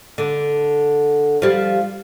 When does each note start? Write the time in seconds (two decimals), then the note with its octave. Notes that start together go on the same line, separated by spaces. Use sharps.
0.18 D3
1.42 F3 G3